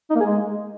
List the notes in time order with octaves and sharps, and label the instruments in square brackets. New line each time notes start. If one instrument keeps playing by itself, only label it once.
[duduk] D#4
A#3
G#4
G#3